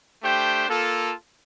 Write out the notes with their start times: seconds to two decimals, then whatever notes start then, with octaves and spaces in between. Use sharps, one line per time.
0.23 A3 D4 G4 C5 G5
0.68 A#3 F4 A4